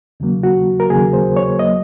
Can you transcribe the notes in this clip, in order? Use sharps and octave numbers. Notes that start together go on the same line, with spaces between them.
D#2 C#3 F#3 A#3
F#4
A#4
D#2 C#3 F#3 A#3 G#4
C5
C#5
F#3 A#3 D#5